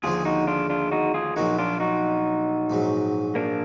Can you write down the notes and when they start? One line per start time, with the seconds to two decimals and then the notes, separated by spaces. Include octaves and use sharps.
0.03 D#2 D3 F3 G#3 F4 G#4
0.25 D#4 F#4
0.47 D4 F4
0.70 D4 F4
0.91 D#4 F#4
1.14 F4 G#4
1.36 A#1 A#2 F#3 A#3 D#4 F#4
1.59 D4 F4
1.80 D#4 F#4
2.70 A#1 G#2 F#3
3.35 A#3 D4